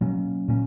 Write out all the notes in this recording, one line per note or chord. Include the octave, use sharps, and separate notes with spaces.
B2 F#3 A#3 C#4
A#2 A#3 C#4